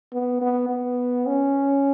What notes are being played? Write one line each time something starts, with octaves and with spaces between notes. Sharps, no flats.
B3
B3
B3
C#4